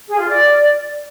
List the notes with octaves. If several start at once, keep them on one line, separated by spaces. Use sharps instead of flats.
G#4
F4
D5